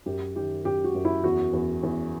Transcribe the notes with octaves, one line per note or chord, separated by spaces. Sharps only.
F#2 G4
D#3 G4
F#2 G4
F#4
F#2
E4
E2 F#4
E2
E2